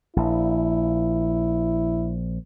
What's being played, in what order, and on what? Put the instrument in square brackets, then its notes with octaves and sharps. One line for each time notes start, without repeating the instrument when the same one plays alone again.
[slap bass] A#1 [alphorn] E4